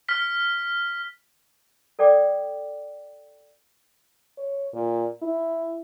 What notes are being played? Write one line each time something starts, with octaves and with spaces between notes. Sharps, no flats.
F6 B6
A4 D5 G5 D6
C#5
A#2
E4